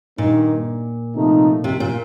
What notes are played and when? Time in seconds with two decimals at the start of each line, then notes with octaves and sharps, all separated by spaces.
0.18 G2 A#2 D#3 A#3 D#4
1.15 C3 F3 A3 D#4
1.64 C3
1.80 A#2